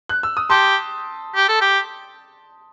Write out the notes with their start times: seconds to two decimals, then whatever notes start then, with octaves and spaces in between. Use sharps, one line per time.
0.09 F#6
0.23 E6
0.37 D#6
0.50 G4 A5 C6
1.35 G4
1.48 A4
1.61 G4